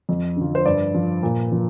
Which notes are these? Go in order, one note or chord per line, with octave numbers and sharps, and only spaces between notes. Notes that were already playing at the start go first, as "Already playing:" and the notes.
F2
D3 F3
C5
G2 D5
F3
A#2
F3